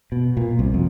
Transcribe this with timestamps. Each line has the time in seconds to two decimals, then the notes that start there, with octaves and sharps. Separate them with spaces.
0.12 B2
0.37 A#2
0.59 C2
0.74 F2